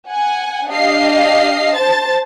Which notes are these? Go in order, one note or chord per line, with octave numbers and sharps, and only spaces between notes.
F#5 G#5
D4 G4 D#5 F5 C7
C5 A5 A6